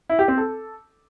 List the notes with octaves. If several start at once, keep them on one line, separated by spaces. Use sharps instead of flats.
E4
G4
C4
A4